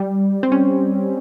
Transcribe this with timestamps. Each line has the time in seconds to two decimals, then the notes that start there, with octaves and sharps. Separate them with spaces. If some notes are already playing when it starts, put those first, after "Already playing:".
Already playing: G3
0.43 C4
0.52 C#4